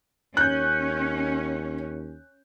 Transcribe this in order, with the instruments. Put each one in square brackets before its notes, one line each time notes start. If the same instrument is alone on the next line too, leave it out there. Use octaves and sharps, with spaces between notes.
[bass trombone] D#2 [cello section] C#4 [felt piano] F#6 G6